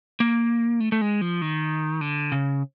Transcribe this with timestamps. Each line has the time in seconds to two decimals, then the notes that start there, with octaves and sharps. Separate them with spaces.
0.20 A#3
0.80 A3
0.92 A3
1.01 G#3
1.21 F3
1.42 D#3
2.01 D3
2.32 C#3